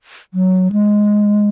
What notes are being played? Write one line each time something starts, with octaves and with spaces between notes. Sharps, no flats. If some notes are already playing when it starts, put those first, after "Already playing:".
F#3
G#3